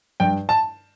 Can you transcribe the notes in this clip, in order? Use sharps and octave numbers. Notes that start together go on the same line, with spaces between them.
G2 G5
A5